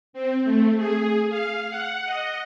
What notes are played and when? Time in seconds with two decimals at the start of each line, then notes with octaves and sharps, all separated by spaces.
0.13 C4
0.44 A3
0.77 G#4
1.29 F5
1.70 F#5
2.05 D#5